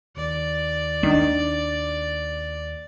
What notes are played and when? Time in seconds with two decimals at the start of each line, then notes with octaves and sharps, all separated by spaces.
0.17 D#2 D5
1.03 D#3 D4